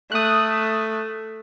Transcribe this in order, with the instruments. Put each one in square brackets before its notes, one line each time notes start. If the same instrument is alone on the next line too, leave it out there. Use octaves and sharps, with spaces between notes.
[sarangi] A3 [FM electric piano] D#6 F#6